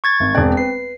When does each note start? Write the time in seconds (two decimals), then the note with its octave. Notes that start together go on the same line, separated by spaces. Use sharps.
0.04 C#6 G#6 A6
0.20 G#1
0.35 E1 C4 D5
0.57 B4 C7